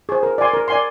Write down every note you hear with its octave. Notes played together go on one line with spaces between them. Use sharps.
G#4 C5
A#4
D5 G#5 C6
A#4
D5 G#5 C6